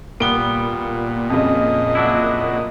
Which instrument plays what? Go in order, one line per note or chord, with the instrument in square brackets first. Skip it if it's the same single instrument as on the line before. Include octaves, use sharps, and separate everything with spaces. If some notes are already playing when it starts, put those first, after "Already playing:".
[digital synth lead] A#2 [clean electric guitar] G3 B3 [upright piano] D7 G7
[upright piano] F2 C#3 [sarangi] D#5
[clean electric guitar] F#3 D4 E4